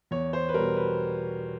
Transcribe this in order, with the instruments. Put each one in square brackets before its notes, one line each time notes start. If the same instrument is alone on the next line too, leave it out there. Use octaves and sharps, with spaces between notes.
[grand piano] E2 C#5
C5
B4
B2 G3 A#4
B4